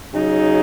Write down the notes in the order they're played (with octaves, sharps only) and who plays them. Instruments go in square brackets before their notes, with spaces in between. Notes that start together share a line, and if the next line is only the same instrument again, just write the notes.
[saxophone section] C#3 F#3 D#4